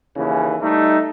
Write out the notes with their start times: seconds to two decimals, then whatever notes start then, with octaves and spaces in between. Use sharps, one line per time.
0.16 D#2 C#3 E3
0.62 G3 A3 D#4